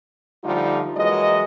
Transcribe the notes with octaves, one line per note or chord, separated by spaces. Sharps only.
D3 F3 G3 A3 D#4 F4
E3 F#3 G#3 A#3 D#5